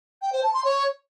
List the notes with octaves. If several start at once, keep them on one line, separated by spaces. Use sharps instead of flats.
G5
C5
A5
C6
C#5